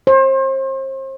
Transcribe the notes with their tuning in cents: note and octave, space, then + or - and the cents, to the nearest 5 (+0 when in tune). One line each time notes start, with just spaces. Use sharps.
C5 +35